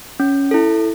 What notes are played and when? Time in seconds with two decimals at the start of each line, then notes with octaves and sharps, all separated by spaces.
0.20 C#4
0.51 E4 A4